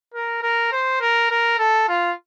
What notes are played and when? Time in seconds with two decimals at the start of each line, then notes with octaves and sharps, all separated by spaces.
0.14 A#4
0.42 A#4
0.72 C5
1.01 A#4
1.31 A#4
1.59 A4
1.88 F4